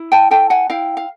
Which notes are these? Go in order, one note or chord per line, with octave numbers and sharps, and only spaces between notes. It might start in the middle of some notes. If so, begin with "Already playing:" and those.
Already playing: E4
G5 A5
A4 G5 A5
F#5 G#5
E4 F5 G5
F5